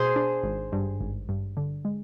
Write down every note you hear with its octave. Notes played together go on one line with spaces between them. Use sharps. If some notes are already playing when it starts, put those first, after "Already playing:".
Already playing: B2 G#4 C5
D4
G#1
G2
G#1
G2
D3
G#3